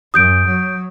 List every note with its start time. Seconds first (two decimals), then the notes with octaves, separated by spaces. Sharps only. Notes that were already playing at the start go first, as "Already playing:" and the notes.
0.14 F#2 D#6 G6 D7
0.46 F#3